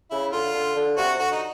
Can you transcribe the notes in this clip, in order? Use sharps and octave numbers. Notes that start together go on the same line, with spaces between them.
C#3 E4
D3 F4
D3
D3
C3 F#4
D3 F#4
D#4